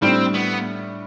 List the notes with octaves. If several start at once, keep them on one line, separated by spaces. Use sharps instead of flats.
A2 G3 C4 D4
B3